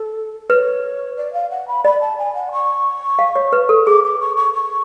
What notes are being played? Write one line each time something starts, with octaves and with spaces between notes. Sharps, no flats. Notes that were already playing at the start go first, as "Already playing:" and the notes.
Already playing: A4
B4 C#5
D5
F5
F#5
B5
D5 B5
A5
G#5
F#5
C#6
F5
C#5
B4
A4
G#4 D6
D6
C#6
C#6
C#6